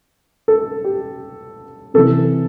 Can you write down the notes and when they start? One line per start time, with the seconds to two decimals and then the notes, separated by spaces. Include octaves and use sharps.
0.48 A4
0.84 G4
1.94 C3 E3 A4